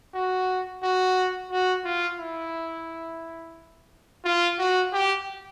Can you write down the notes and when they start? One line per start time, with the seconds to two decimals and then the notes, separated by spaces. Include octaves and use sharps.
0.14 F#4
0.83 F#4
1.51 F#4
1.85 F4
2.19 E4
4.25 F4
4.58 F#4
4.93 G4